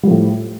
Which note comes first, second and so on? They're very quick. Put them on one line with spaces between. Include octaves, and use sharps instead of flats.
G3 F3 A2